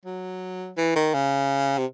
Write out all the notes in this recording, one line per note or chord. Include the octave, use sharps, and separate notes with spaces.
F#3
E3
D#3
C#3
C3